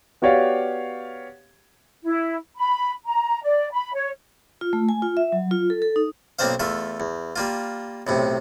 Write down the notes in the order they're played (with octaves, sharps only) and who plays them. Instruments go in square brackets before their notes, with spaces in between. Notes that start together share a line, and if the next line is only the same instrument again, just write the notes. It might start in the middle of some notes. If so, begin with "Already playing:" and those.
[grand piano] B3 F#4 G4 C#5 D5 F5
[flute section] E4
B5
A#5
D5
B5
C#5
[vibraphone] F4
A3
G#5
F4
E5
F#3
F4
A4
A4
D#4
[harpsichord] B1 A#3 C4 D4 C5 F5
E2 A3 F4 E5
E2
G3 A#3 F4
B1 A2 C3